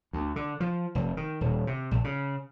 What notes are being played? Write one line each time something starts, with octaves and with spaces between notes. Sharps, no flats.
D2
D3
F3
F1
D#3
D#1
C3
A#1
C#3